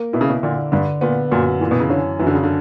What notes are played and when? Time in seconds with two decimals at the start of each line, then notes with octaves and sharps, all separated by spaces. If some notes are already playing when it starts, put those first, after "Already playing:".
Already playing: A#3
0.13 B2 E4
0.21 C#3
0.30 B2
0.43 A#2 D3
0.72 G2 D3
1.01 A#2 B3
1.32 F#2 A#2
1.60 A#2 E3
1.71 B2
1.80 C#3
1.89 D3 C#4
2.19 F#2 E3
2.27 D3
2.35 C#3
2.43 D3